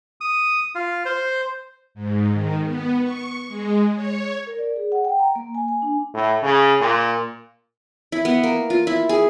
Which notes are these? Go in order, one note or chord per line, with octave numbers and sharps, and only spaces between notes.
D#6
F4
C5
G#2
D#3
B3
C#6
G#3
C#5
A#4
D5
G#4
F#5
G5
A#5
A#3
G#5
G#5
D4
A2
C#3
A#2
E4
B3
A#3
F4
E4
G#4